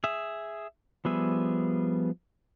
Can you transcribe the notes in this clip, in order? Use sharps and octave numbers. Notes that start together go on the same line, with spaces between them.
G#4 E5
F3 G3 B3 G#4 E5